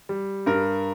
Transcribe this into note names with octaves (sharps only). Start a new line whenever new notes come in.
G3
G2 A#4